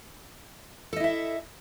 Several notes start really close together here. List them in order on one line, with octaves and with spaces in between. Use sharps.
A4 D#5 E4 E5